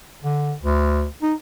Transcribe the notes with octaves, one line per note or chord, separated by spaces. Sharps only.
D3
D2
D#4